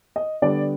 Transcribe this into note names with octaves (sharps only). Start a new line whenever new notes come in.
D#5
D3 G3 B3 D5